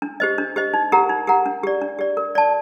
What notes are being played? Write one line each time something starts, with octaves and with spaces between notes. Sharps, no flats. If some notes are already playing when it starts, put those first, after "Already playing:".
D4
G4 C5 D#5
D4
G4 C5 D#5
D#4
G4 A#4 F#5 A#5
D#4
G4 A#4 F#5 A#5
D4
G4 D5
D4
G4 D5
A#4
D5 A5